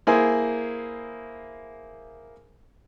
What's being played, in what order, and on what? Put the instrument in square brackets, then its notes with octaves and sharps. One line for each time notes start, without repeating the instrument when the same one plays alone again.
[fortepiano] A#3 E4 G#4 C5 G#5